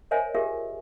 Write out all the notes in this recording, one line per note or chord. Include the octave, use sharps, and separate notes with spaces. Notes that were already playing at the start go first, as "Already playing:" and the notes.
A#4 C5 C#5 D#5 E5 G#5
F4 G4 G#4 A#4 E5